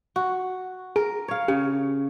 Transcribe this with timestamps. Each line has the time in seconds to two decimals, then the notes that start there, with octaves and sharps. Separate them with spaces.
0.16 F#4
0.96 G#4 A#4
1.28 C#5 F5
1.48 C#3 G4